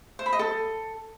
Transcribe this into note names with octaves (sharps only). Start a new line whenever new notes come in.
C5
B5
D#5
A4